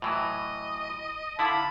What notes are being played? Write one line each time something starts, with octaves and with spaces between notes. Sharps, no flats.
A2 E3 F#3 D#5
D3 E4 F5 A5 B5